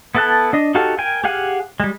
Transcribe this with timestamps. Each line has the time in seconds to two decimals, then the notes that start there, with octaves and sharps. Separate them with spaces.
0.15 B3 E4 A4 A5 F#6
0.53 D4 D#5
0.75 D#4 F#4 G4 A4 F5
0.98 A#4 G5 G#5
1.24 G4 G#4 F5 F#5 G#5
1.80 G3 G#3